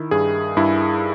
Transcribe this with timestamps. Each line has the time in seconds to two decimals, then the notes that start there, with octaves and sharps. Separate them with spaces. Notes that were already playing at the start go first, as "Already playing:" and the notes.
Already playing: D#3 E4
0.11 G2 G#4
0.57 G2 E4